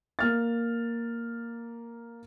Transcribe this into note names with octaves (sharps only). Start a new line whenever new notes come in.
A#3 F6 A6